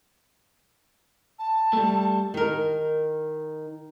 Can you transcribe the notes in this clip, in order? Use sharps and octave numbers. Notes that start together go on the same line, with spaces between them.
A5
G3 A3
D#3 A#4